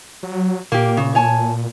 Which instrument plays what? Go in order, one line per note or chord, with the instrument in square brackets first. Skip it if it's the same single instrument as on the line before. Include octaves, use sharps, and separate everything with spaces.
[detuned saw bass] F#3
[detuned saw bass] A#2 [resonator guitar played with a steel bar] A#3 G4
[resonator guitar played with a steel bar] C#3
C#5 G#5 A5